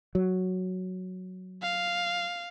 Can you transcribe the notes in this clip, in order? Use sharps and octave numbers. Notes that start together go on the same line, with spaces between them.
F#3
F5